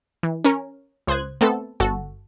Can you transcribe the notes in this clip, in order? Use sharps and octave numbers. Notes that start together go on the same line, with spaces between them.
E3
C#4 A#4
C#2 C5 D#6 F#6 G#6
A3 B3 C4 A4
G1 F#4 A4